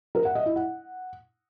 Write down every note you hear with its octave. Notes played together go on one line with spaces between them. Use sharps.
A#4
F#5
D#5
E4
F#5